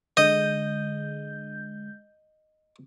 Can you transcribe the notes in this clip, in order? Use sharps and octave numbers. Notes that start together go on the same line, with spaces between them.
D3 G#3 D#5 G6